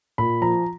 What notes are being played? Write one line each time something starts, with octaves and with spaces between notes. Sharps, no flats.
A#2 B5
F3 A#5